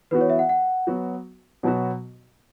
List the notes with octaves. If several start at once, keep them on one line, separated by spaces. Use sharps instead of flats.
E3 B3 F#4 B4
C#5
E5
F#5
F#5
F#3 B3 F#4
B2 F#3 B3 F#4 F#5